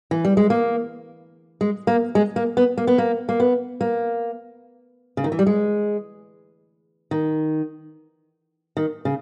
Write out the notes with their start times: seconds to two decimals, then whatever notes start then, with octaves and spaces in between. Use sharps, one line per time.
0.11 E3
0.25 G3
0.37 G#3
0.50 A#3
1.61 G#3
1.87 A#3
2.15 G#3
2.36 A#3
2.57 B3
2.77 A#3
2.87 B3
2.98 A#3
3.29 A#3
3.40 B3
3.81 A#3
5.17 C#3
5.24 D#3
5.32 E3
5.39 G3
5.47 G#3
7.11 D#3
8.77 D#3
9.05 C#3